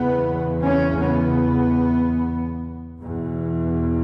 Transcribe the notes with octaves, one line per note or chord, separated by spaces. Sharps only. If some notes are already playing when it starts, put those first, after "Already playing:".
Already playing: E2 C#3 B3
C#4
B3
E2 B2